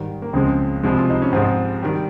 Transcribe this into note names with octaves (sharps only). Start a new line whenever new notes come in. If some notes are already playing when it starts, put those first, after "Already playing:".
Already playing: G#2 D#3 G3
A#3
C#2 C#3 F3 G#3 C4
C2 C3 F3 G#3
F4
D#4
C#4
G#2 F3 G#3 C4
D#3 G3